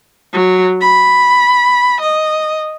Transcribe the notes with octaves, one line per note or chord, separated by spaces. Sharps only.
F#3
B5
D#5